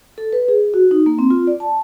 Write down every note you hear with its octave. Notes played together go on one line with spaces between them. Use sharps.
A4
B4
G#4
F#4
D#4
A#3
C4
F4
D5
A5